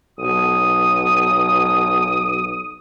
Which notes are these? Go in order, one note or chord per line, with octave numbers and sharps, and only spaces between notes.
B1 D#6